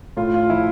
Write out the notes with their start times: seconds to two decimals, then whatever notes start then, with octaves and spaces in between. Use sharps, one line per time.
0.17 A2 F4
0.34 F4
0.50 F3 E4